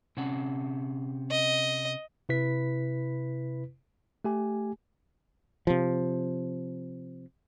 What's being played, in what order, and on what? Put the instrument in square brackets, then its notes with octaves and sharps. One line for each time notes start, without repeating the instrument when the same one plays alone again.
[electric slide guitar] C3 C#4 F#5
[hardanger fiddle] D#5
[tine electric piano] C3 E4 B4 B6
A3 G4 G#5
[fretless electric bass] C3 F3